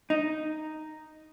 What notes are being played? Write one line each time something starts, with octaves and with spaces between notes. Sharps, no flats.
D#4